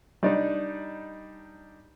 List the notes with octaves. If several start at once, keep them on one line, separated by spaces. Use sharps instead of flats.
G3 D4 D#4